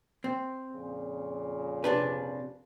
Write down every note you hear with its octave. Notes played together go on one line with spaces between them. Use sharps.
C4
F2 A#2 C#3
C3 D4 B4